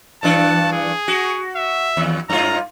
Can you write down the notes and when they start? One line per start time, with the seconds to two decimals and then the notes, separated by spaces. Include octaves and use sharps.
0.23 G2 E3 D4 A5
0.73 G#4
1.08 F#4
1.56 E5
1.97 D#2
2.30 G2 F4 A#5